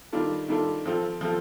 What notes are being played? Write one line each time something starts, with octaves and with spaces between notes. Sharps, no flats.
D#3 G3 D4 F4 A4
D#3 G3 D4 F4 A4
F3 C4 F4 A4
F3 C4 F4 A4